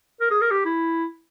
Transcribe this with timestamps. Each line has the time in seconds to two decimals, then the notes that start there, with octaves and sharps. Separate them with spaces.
0.21 A#4
0.31 G#4
0.41 A#4
0.51 G4
0.65 E4